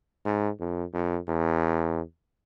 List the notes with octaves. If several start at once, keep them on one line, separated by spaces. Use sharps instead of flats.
G#2
F2
F2
E2